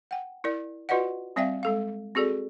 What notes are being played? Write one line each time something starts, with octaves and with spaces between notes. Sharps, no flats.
F#5 G5
E4 A#4 D5
F4 F#4 B4 D5 D#5 F#5
G3 C4 D5 E5 F5 G5
G#3 A4 F5
C4 F#4 G#4 A4 D5